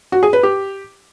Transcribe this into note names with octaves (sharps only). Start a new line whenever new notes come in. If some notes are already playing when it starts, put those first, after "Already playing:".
F#4
G#4
B4
G4